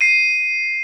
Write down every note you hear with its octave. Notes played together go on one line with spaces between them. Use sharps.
C7 D#7